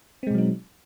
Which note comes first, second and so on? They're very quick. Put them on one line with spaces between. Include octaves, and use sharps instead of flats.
C4 G#3 B2 F#3 D#4